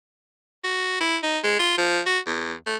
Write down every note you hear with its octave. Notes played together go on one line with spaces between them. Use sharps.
F#4
E4
D#4
G#3
F4
F3
F#4
E2
A3